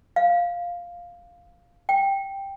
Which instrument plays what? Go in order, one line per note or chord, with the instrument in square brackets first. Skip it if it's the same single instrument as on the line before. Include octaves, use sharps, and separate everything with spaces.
[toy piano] F5
G5